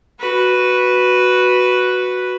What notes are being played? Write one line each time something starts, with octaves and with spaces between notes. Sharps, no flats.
F#4 B4